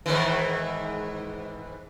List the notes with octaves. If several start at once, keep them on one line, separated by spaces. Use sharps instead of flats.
G#2 D#3 E3